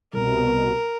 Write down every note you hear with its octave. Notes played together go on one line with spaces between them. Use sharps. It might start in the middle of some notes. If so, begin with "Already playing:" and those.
C2 B2 A#4